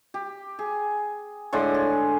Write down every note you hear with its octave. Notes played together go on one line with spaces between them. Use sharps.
G4
G#4
A2 D3 G#3 C6
G#4